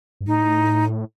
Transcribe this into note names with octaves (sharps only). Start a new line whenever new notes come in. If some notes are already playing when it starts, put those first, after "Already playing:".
G2
A2 D#4